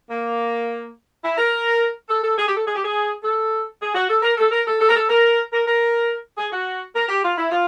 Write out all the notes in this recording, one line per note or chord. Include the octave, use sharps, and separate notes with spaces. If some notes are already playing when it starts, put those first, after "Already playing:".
A#3
E4
A#4
A4
A4
G#4
G4
A4
G#4
G4
G#4
A4
G#4
F#4
A4
A#4
A4
A#4
A4
A4
A#4
A4
A#4
A#4
A#4
G#4
F#4
A#4
G4
F4
E4
F4